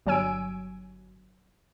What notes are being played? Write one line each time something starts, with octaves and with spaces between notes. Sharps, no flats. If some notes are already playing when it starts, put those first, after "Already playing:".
G1 F#3 C#5 G#5 E6 D7